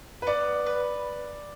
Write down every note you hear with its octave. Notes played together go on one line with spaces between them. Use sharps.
B4
B3 D5
B4